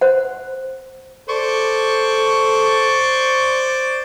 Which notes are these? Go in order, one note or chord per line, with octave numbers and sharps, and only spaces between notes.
C5 F#5
A4 C5 D5 C#6